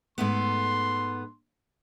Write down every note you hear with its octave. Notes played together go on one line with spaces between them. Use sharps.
G#2 A3 B3 C6